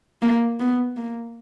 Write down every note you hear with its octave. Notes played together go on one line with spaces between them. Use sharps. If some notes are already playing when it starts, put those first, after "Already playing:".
A#3
B3
A#3